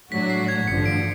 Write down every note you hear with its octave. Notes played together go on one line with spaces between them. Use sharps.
A2 F#3 A3 D4 F#4 B6
C7
G#6
A1 G2 D3 F3 C#7
D7